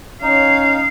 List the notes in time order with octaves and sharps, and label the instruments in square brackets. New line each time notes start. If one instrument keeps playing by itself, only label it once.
[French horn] C#4 [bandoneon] D#4 [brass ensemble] C#5 [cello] F5